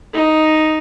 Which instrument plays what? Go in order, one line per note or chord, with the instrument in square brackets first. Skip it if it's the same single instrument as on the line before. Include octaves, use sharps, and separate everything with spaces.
[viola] D#4